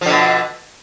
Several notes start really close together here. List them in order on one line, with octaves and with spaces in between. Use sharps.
F3 D3 B2